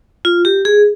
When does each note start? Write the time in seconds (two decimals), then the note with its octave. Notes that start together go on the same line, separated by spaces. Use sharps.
0.25 F4
0.45 G4
0.65 G#4